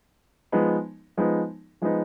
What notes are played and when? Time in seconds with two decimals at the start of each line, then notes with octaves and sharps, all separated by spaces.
0.52 F3 G#3 B3 D#4
1.17 F3 G#3 B3 D#4
1.82 F3 G#3 B3 D#4